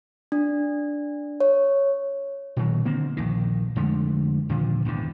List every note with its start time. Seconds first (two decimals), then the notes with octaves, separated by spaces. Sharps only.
0.32 D4
1.40 C#5
2.57 A#2 D#3 F#3
2.85 D3 A#3 C4
3.17 A#1 D#2 D#3
3.76 F2 D3 G#3 A3
4.49 D#2 A#2 D3 F3
4.85 G#1 E2 G#2 D3